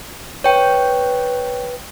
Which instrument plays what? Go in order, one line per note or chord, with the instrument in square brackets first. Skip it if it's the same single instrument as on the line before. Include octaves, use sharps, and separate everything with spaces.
[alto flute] B4 [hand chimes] C#5 G5